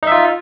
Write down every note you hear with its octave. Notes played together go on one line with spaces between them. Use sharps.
D#4 F4 E5